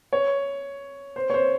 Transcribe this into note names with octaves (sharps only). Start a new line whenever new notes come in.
C#5
C5
C#5
C5